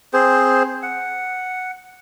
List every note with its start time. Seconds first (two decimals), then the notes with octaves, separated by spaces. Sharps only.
0.13 C4 G#4 C5
0.83 F#5